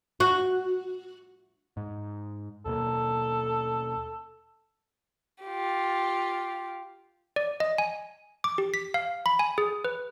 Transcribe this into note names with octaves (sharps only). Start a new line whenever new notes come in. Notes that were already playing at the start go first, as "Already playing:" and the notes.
F#4
G#2
D#2 B2 A#3 A4
F4 G4
D5
D#5
G#5
D6
G4
B6
F5
B5
G#5
G#4
B4